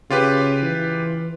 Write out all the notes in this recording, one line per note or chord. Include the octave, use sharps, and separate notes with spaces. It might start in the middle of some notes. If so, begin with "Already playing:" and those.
C#3 F4 G4 B4
E3